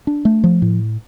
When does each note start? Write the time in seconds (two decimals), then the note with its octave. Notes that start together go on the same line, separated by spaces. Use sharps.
0.07 D4
0.25 A3
0.44 F3
0.62 A2